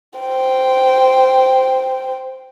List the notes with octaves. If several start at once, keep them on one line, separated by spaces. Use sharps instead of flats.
C5 G5